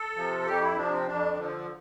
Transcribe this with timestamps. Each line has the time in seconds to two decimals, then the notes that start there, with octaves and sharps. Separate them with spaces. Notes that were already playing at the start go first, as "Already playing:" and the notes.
Already playing: A4
0.16 C3 F3
0.46 F2 G4
0.61 E4
0.76 C3 F3 D4
0.91 C4
1.07 F2 D4
1.36 D3 F3